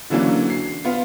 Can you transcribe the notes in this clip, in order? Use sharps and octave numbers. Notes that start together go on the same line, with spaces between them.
D3 E3 F#3 A#3 C#4 D4
C7
B3 F4